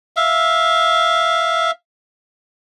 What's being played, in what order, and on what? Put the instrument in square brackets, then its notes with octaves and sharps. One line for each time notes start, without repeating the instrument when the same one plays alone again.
[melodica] E5 F5